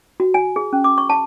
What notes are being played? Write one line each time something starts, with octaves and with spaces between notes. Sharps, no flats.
F#4
G#5
G#4
C#4
D6
C#6
A5